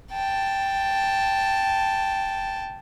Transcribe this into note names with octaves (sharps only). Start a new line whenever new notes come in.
G5 A5